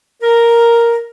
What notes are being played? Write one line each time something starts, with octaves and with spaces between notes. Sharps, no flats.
A#4